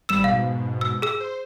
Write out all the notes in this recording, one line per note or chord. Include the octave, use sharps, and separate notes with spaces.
G#1 G3 B5 E6 E7
G#2 B2 F5
E6
G#4 E6
C5